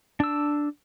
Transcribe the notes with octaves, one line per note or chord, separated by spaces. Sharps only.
D4 E6